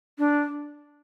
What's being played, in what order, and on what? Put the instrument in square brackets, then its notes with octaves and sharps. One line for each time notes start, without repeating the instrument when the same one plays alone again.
[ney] D4